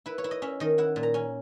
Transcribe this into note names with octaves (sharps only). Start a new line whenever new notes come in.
E4 B4
C#5
E4
D#5
C#4 E5
D#3 D#5
E4 F#5
A#2
A#5
C#4 G#5